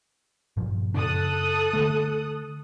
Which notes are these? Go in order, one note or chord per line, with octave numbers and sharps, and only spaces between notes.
G2 A#2 F3
F#2 C#3 D4 A4 D#6 F#6
D3 A3